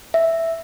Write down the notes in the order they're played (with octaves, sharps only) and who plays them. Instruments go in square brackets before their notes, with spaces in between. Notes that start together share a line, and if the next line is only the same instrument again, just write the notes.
[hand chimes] E5